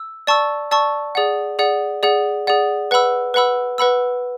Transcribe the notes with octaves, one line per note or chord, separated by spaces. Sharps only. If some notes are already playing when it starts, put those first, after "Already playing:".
Already playing: E6
D5 A5 C#6 E6
D5 A5 C#6 E6
G#4 D5 F#5
G#4 D5 F#5
G#4 D5 F#5
G#4 D5 F#5
B4 F#5 B5 E6
B4 F#5 B5 E6
B4 F#5 B5 E6